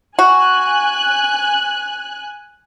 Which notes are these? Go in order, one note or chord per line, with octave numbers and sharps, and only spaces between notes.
F#4 G#5 F#6